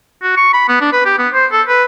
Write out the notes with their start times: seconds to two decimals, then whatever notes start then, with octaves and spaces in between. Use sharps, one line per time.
0.22 F#4
0.37 C#6
0.53 B5
0.69 B3
0.81 D4
0.93 B4
1.05 G4
1.18 B3
1.34 C5
1.52 A4
1.68 B4